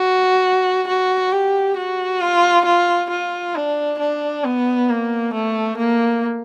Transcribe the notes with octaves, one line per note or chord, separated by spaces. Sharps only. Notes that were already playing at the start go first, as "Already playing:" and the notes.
Already playing: F#4
F#4
G4
F#4
F4
F4
F4
D4
D4
B3
A#3
A3
A#3